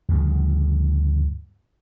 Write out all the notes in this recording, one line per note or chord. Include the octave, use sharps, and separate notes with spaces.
D2 G2 C#3 F3